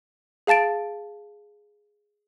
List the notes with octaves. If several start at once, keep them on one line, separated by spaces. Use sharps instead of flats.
G#4 F5 A5 A6 D7